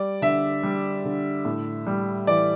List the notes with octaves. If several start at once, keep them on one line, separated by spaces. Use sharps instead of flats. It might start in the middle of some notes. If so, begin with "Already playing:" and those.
Already playing: G3 D5
D3 E5
G3
D3
A2
G3
E3 D5